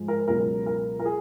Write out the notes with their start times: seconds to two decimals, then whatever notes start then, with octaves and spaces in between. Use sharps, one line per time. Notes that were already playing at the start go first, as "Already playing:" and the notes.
Already playing: G#2 F3 G#3
0.08 A#4
0.28 C#2 B2 F#3 A#4
0.66 A#4
0.99 A#4
1.05 G#4